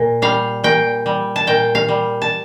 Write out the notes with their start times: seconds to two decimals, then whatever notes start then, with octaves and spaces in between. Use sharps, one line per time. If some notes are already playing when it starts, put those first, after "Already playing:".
Already playing: A#2
0.22 G3 F5
0.64 A#2 G5
1.06 G3
1.36 A5
1.47 A#2 G5
1.75 F5
1.88 G3
2.22 A5